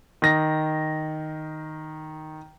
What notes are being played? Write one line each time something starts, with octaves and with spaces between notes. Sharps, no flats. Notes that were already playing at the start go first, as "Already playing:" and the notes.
D#3 A#6